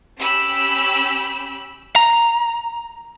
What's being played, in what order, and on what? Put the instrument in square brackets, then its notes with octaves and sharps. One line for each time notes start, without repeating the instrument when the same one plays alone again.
[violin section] C#4 G4 B5 E6
[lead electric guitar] A#5